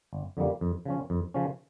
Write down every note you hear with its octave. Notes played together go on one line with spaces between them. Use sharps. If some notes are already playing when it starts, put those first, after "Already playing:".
G1
F2 D3 G3 A#3
F2
C#3 F3 C#4
F2
C#3 F3 C#4